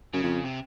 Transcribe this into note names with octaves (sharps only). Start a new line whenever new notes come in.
F#2 C#3
F2
C3